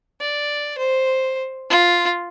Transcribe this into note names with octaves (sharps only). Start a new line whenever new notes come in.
D5
C5
F4